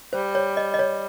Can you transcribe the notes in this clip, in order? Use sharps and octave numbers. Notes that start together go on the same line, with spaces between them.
G3 C5
C#5
D#5
D#5
C#5